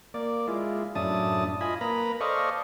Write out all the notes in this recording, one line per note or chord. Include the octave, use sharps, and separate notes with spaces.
A#3 D5
G#3 E4 F4
F#2 A2 D4 E4 A5 D#6
F4 D#5 G#5 B5
A#3 B4 A#5 B5
A4 C5 D5 D#5 F5 C#6